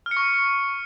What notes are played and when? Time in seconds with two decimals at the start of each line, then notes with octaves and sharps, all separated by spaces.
0.06 F6
0.11 C#7
0.17 C#6